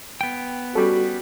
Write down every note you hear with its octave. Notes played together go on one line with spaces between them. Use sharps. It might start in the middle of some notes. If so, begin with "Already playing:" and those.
B3 G5
G3 C#4 F#4 A4